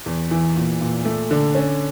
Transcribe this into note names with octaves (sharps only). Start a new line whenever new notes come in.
E2
E3
A#2
A#2
A3
D3
C#4